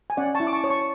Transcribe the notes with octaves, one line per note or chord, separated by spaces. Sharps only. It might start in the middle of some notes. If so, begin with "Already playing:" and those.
G#5
C#4 D5 F#5
A5 C#6
E4
D6
A5 C#6
C#5
A5 C#6